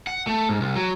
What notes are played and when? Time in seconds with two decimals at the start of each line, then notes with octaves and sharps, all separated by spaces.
0.07 F#5
0.27 A3
0.49 G#2
0.61 C2
0.76 F#3